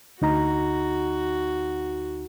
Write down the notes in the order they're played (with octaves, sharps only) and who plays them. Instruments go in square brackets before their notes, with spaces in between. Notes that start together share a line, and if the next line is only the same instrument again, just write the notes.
[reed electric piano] D2 D#4 A#5 [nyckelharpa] F#4